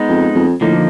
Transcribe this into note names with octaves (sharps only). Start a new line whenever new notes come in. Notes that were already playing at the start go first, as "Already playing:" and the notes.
Already playing: G#3 B3 D#4
F2
F2
A2 D3 F3 A#3 D#4